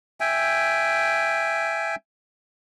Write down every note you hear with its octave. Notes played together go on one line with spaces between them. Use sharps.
E5 G5 G#5